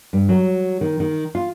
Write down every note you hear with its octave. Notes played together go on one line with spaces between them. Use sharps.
G2
F#3
D#3
D#3
F4